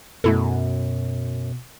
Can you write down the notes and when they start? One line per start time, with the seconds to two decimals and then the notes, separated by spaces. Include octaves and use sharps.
0.24 F#2 B2 A3 E4 A4